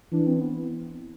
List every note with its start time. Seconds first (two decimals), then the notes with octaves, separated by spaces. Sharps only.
0.12 E3 D4
0.27 C4
0.42 B3